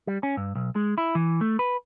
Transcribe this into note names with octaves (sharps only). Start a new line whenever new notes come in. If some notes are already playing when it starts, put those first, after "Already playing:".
G3
C#4
G2
B1
G#3
E4
E3
A3
B4